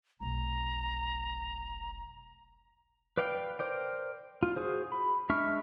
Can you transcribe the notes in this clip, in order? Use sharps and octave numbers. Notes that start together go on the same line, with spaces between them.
F1 B1 A#5
B4 D5 F5 G5
A#4 C5 D5 G5
F4
F#4 G#4 C5
B5
G#3 D4 E5 C#6 F6